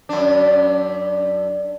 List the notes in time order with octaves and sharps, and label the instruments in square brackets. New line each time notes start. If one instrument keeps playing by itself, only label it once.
[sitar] F#2 D4